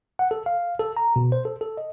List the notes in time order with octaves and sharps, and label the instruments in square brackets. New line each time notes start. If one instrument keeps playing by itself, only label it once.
[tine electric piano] F#5
A4
F5
A4
A#5
B2
C5
A4
A4
D#5